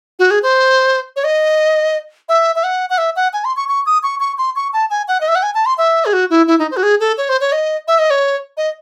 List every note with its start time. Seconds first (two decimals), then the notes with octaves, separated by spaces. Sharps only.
0.19 F#4
0.31 G#4
0.43 C5
1.16 C#5
1.24 D#5
2.29 E5
2.56 E5
2.64 F#5
2.90 F#5
2.98 E5
3.16 F#5
3.33 G#5
3.45 C6
3.57 C#6
3.69 C#6
3.86 D#6
4.03 C#6
4.20 C#6
4.38 C6
4.56 C#6
4.73 A5
4.90 G#5
5.08 F#5
5.21 D#5
5.28 E5
5.35 F#5
5.43 G#5
5.55 A5
5.66 C6
5.78 E5
6.05 G#4
6.13 F#4
6.30 E4
6.48 E4
6.59 D#4
6.71 C5
6.77 F#4
6.83 G#4
7.00 A4
7.18 C#5
7.29 C5
7.41 C#5
7.52 D#5
7.88 E5
7.99 D#5
8.10 C#5
8.57 D#5